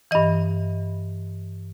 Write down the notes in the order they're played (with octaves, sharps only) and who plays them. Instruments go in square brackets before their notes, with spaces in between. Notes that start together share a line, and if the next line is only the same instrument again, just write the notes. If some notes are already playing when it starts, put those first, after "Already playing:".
[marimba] G2 E3 D#5